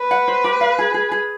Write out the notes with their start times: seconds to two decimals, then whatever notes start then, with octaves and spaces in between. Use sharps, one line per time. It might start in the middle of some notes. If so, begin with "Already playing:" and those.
Already playing: B4
0.11 F#5
0.28 C5
0.44 G4
0.61 F5
0.79 G#4
0.94 G#4
1.11 G#4